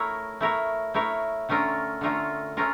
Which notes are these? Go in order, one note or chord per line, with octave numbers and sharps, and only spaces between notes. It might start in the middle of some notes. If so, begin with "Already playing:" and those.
Already playing: A3 E4 A#4 C#5
A3 E4 A#4 C#5
A3 E4 A#4 C#5
D3 A3 C#4 F4 A#4
D3 A3 C#4 F4 A#4
A3 C#4 F4 A#4